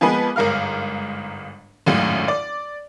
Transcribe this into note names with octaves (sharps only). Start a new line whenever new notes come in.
F3 G#3 A#3 B3 G#4 B4
G1 G#2 A#4 F5 F6
G#1 C#2 F#2 A2
D5